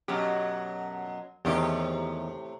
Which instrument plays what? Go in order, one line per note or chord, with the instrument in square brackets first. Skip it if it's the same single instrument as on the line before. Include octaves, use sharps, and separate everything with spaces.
[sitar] F#2 B2 F#3 [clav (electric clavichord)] G4
[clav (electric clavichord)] E2 D#3 [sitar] A2 C3 G4